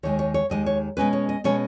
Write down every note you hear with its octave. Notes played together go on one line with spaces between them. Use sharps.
D#2 D#3 G#3 C#5
C#5
C#5
D#2 D#3 G#3 D#5
C#5
B2 G#3 C#4 B4
C#5
D#5
B2 G#3 C#4 C#5